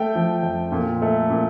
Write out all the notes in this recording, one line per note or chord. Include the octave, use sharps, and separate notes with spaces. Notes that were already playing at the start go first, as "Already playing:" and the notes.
Already playing: A3 G5
F3
F2
A#2
A3
A#2